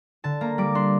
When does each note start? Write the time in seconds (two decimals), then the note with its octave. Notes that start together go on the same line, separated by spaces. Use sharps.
0.24 D3 A5
0.41 A#3 A#5
0.58 G3 D6
0.75 D4 C6